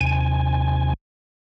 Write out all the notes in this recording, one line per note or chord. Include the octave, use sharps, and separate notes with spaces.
D#2 C3 G#5